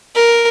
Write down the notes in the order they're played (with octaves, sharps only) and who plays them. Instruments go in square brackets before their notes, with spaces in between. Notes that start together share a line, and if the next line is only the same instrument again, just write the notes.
[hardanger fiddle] A#4